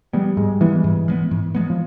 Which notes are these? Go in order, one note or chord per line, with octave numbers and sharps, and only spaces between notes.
F3 G3 G#3 B3
G#2 G#3
E3 F3 G#3 B3
G#2
F3 G#3 B3
G#2
F3 G#3 B3
F3